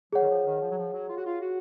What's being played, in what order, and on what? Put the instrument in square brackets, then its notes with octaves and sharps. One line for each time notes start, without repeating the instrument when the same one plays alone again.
[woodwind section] F#3 [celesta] G#4 C#5 F#5
[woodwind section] D#3
F3
D#3
F3
F#3
F3
F#3
F4
F#4
F4
F#4